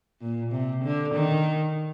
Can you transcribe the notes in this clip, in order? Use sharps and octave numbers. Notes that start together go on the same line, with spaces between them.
A#2
C3
D3
D#3